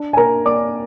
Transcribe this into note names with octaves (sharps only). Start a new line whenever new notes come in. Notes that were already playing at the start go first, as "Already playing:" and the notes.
Already playing: D4
G#5
A#3 A#4 A#5
A#3 D5 D6